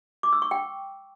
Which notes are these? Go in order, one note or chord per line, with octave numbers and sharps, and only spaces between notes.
D6
E6
C#6
G5